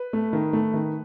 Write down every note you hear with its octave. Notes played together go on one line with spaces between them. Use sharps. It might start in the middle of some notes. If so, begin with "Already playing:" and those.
Already playing: B4
A3
D#3
A3
D#3